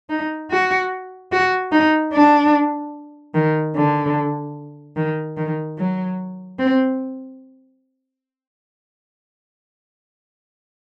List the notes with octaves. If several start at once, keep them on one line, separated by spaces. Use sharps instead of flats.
D#4
F#4
F#4
D#4
D4
D#3
D3
D#3
D#3
F#3
C4